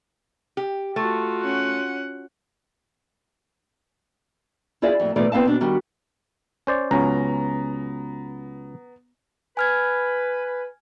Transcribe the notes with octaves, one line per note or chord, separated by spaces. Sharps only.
G4
A3 F4 F#4
C#4 F#5
E4 F4 G#4 D5 E5
F2 A2
G#2 B2 E3 A3 D#4 D5
B3 C4 E4 F5 A5
B2 D4
D#3 G3 F#4
C#4 C5 D5
C#2 F#3 B3 C#4 A#5
B4 G#5 F6 G#6